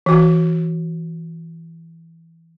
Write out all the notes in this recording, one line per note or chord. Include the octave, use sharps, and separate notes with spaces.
E3 F#4